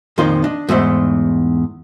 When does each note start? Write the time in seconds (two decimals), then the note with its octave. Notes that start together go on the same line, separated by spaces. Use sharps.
0.18 F2 A#2 D#3 F3 F4 C6
0.44 D4 D#5
0.69 E2 G#2 A3 C5